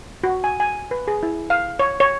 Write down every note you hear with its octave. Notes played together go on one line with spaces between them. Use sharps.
F#4
G#5
G#5
B4
G#4
E4
F5
C#5
C#5